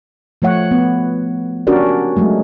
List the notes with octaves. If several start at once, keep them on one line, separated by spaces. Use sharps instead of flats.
F3 A3 C#5 F#5
B3
C#4 D4 F#4 G4 A#4 D5
F#3 G#3 A3